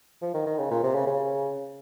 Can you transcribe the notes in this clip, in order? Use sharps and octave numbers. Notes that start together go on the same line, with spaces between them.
F3
D#3
D#3
C#3
A#2
C3
C#3
C#3